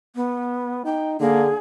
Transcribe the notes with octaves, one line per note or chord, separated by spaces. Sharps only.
B3
D#4 G5
D3 A#3 G#4